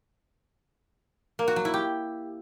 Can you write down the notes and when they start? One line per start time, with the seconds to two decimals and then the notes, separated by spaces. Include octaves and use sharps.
1.39 A#3
1.48 F#4
1.56 F#3
1.65 E4
1.74 G4